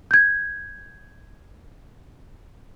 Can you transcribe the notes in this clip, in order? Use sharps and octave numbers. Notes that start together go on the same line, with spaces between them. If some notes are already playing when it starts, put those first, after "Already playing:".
G6 G#6